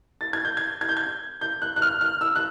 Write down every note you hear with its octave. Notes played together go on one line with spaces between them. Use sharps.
A6
G#6
G6
G#6
G#6
G6
G#6
G6
F#6
F#6
F6
F6
E6
F#6